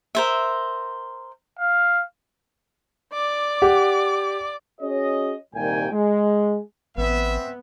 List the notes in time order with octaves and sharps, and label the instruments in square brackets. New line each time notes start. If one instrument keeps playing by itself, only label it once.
[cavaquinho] A#4 C5 E5
[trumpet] F5
[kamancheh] D5 D6
[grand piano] G4 F#5
[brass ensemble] C#4 F#4 G#4 C#5 D#5
C2 A#2 D#3 G3 G5 G#5
G#3
[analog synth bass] A1 [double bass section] B3 [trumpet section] C4 E5